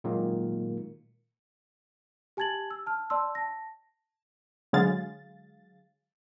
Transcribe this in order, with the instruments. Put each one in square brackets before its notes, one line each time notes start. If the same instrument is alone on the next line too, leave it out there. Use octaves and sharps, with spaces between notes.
[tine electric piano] A#2 D#3 F#3 G#3 A#3
[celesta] G4 G#5 A5 G#6 A6 F#7
E6
A5 F6
D5 A5 C6 E6
A5 A#6
[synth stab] D3 F#3 G#3 G#4 F5 A6